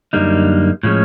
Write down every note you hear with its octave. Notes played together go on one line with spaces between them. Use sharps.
F#2 D3 G3 A#3 D#4
A2 F3 G#3 C#4